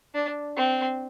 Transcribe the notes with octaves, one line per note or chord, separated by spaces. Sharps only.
D4
C4